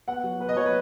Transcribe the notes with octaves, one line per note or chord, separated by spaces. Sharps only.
B3 F#5
F#3
B3 B4
D#5
F#3 C#5
B4